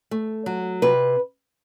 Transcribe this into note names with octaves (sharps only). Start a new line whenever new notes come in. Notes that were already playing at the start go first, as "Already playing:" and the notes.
A3
F#3
C3 B4